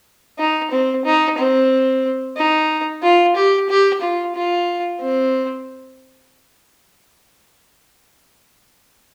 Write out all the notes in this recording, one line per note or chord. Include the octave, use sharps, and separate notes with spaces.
D#4
C4
D#4
C4
D#4
F4
G4
G4
F4
F4
C4